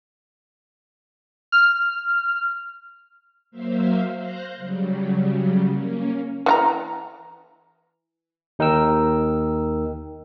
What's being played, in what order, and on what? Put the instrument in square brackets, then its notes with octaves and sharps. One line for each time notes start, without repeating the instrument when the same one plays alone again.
[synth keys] F6
[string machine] F#3 A#3 C5 E5 F5
C5 F5 F#6 G6 A#6
C#3 F#3 G3
A#3 C#4
[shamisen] E3 F4 A#5
[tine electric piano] D#2 D#4 A#4 G5 E6